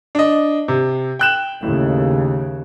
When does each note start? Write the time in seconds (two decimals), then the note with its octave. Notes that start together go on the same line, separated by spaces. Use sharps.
0.15 D4 D#5
0.68 C3
1.19 G5 F#6 E7
1.63 D#2 A2 C#3